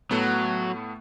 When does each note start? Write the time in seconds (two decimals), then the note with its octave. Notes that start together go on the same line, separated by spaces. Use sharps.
0.11 A2 F#3 A3 B3